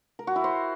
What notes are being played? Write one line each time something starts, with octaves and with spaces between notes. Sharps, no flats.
A#4
F#4
E4
C5